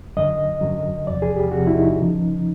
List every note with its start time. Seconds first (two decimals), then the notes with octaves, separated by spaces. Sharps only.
0.17 F#2 D3 F#3 D#5
0.61 F#2 D3 F#3
1.06 E2 C3 F3 D5
1.22 G#4
1.36 G4
1.52 E2 C3 F3 F#4
1.67 E4
1.74 D#4
1.99 C#3 F3